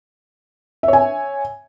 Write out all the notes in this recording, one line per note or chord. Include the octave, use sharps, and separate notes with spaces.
C#5 E5 G#5